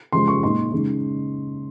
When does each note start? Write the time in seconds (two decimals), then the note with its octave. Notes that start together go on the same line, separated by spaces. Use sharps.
0.12 C#3 F3 G#3 C6
0.28 C#6
0.43 A#2 G#3 D#4 C6
0.72 C#3 G#3 D#4